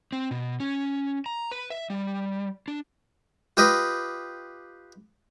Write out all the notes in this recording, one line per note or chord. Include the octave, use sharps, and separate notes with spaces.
C4
B2
C#4
A#5
B4
E5
G3
D4
F4 G4 B4 D#5